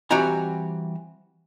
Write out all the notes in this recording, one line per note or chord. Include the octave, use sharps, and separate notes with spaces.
E3 G3 C4 F#4 G#5 A#5